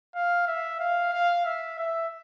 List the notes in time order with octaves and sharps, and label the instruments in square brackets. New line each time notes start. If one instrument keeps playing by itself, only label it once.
[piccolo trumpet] F5
E5
F5
F5
E5
E5